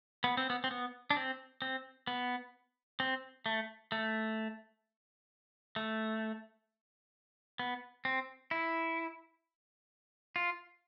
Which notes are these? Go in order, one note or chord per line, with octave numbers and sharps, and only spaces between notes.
B3
C4
B3
C4
B3
D4
C4
C4
B3
C4
A3
A3
A3
B3
C4
E4
F4